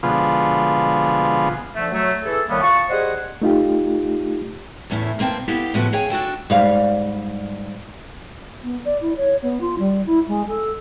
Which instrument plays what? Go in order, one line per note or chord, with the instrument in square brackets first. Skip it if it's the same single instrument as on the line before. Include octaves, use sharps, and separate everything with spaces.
[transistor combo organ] B2 D3 F3 G#3 B3 F4
[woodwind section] D3 F3 A3
F#3 A3
E3 G#4 A4
A2 D#3 G3 A#3 B3
F4 A5 C#6
G3 G#4 C5 D#5 F#5
[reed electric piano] A3 D#4 F4 G4
[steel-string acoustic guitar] E2 A2 C#4 E4
B2 A#3 C4 G5 A5
B3 E4 G4 A4 F5 G5
A2 C#3 F3 B3 F#4 A4
G#4 C#5 F5 G5 G#5
D4 F#4 A4 G5
[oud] G#2 G3 F5
[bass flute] B3
D5
E4
C#5
B3
F4
G3
E4
G#3
A4